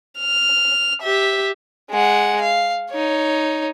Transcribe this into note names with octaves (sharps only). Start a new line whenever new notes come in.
F6
G4 E5
G#3 F#5
F5
D#4 C#5